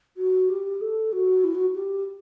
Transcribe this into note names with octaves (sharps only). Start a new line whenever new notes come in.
F#4
G4
A4
F#4
E4
F#4
G4